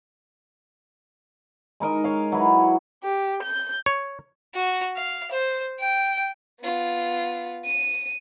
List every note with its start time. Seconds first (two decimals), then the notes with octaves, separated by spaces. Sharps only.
1.80 G#3 D#4 A#4 D#5
2.04 C#5 F5
2.32 F#3 E4 B4
3.03 G4
3.43 G6
3.86 C#5
4.55 F#4
4.96 F5
5.31 C5
5.79 G5
6.61 B3 F4
7.65 D#7